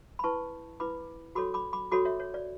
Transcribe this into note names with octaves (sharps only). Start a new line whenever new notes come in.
B5
E4 B4 A5 C#6
E4 B4 B5 D6
F#4 A4 C#5 B5 D6
B5 D6
B5 D6
F#4 A4 C#5 B5 D6
C#5 E5
C#5
D5